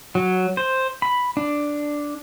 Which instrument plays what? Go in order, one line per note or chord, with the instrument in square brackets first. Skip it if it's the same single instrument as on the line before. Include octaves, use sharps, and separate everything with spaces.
[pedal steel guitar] F#3
C5
B5
D4